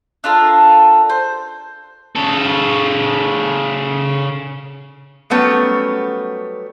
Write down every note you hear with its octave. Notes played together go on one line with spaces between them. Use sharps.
D4 F4 A4 A#4
C5
C#3 A4
F#3 G3 A3 B3 C#4